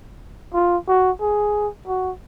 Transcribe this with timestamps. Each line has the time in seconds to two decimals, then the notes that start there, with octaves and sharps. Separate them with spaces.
0.54 F4
0.88 F#4
1.21 G#4
1.88 F#4